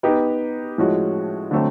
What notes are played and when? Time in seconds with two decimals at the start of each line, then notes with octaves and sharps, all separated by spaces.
0.03 B3 D#4 G4 B4
0.78 A2 F3 G#3 C#4 F#4
1.51 D3 F#3 A3 C4